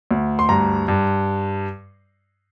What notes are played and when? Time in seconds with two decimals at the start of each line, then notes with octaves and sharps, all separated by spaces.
0.11 D2
0.39 C6
0.49 G2 A#5
0.88 G2